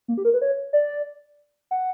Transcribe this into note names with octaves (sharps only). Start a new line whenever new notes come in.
A#3
G4
A#4
B4
C#5
D5
F#5